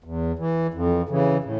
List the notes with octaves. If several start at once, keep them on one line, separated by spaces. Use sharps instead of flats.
E2
E3
F2
C#3 E3
A2